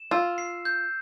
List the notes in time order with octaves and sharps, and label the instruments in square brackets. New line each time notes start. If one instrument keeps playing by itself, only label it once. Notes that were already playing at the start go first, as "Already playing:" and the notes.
Already playing: [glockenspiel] E7
[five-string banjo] F4 [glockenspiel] E6
[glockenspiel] C7
G6